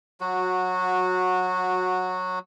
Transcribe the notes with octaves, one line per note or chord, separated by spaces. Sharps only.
F#3 F#4